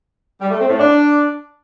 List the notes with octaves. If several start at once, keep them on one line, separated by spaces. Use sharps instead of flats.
G3
A3
C4
A2
D4